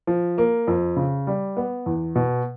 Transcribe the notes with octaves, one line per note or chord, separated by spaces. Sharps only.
F3
A#3
F2
C#3
G3
B3
E2
B2